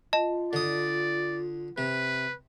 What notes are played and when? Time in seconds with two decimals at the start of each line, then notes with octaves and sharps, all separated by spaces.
0.13 F4 D#5 A5
0.53 D3 D5 D#6
1.78 C3 B4